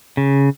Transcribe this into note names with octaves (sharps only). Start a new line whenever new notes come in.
C#3